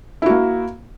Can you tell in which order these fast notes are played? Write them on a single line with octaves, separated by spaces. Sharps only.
E4 F#4 A#3